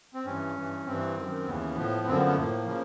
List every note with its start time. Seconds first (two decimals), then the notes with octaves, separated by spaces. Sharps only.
0.14 C4
0.26 G2 E3 C#4
0.56 G2 E3
0.86 G2 E3 C4
1.17 F#2 D#3
1.47 D#2 C#3 E3 B3
1.76 A2 F3
2.07 F#2 D3 F3 C4
2.16 B3
2.27 B3
2.32 A3
2.37 A2 F3 A#3
2.67 C#3 F3